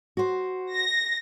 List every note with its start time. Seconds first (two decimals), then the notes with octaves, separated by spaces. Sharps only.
0.17 F#4 C5
0.73 A#6